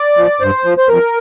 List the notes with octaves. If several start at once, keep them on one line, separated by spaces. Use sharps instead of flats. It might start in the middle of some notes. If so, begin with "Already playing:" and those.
Already playing: D5
F3
G2 C5
F3
C5
F2 A#4